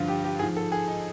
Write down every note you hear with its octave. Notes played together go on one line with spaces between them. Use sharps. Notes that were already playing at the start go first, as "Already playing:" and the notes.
Already playing: G2 D3 F3 F4
G4
G4
G#2 F3 G#4
A4
G#4
D#4